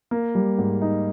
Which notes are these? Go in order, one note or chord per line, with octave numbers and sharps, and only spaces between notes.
A#3
G3
G#2
D#4